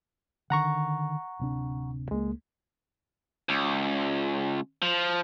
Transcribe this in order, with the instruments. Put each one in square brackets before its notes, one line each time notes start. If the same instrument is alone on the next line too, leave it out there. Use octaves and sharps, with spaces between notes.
[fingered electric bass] D3 D#3 [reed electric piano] F#5 A#5 C#6
[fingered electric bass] D1 C3 D4
[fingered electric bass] C#2 A#3 [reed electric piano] G#3
[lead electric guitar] C#2
F3